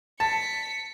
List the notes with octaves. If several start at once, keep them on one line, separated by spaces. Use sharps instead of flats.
A5 B6 C#7